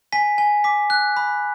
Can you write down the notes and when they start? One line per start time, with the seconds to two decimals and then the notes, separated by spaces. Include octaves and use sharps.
0.13 G#5 B6
0.38 G#5
0.64 D6 B6
0.90 F#6
1.17 B5